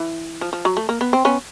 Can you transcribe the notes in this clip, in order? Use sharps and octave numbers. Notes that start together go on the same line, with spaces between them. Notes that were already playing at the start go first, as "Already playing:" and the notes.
Already playing: E3
F3
F3
F#3
A3
A#3
B3
C4
B3 C#4